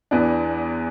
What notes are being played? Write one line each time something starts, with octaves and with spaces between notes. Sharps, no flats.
E2 E3 B3 D4